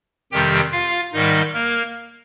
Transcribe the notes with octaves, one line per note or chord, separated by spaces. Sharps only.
F2 C3 D#3 G3 G4 G5
F4 F5
G#2 D#3 G3 D#4 D#5
A#3 A#4